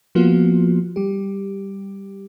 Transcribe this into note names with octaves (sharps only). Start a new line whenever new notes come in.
F3 A#3 B3 F4 F#4
G3 G4